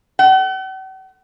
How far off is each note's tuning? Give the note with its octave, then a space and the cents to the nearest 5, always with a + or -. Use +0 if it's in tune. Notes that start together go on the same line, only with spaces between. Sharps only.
F#5 +45